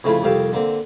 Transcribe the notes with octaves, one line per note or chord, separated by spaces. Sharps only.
F2 C#3 A3 E4 F4
C2 F2 G4 F5 G5 A5
D3 A#3 C4